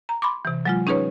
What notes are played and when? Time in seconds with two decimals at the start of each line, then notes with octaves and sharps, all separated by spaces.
0.09 A#5
0.22 B5 C6 D6
0.45 C3 E3
0.65 F#3 G#3 F4
0.87 C#4 D#4 G#4 B4 C#5